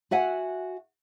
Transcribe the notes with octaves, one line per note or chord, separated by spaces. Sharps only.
F#4 E5 F#5 G#5